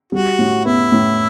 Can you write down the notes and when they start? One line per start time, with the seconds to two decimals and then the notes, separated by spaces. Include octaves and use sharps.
0.12 G3 F#4
0.39 A2
0.65 B3 E4
0.92 A2